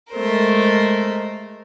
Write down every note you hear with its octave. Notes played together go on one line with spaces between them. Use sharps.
G#3 A3 A#4 C5